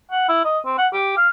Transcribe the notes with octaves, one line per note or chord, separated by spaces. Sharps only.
F#5
E4
D#5
C4
F#5
G4
F5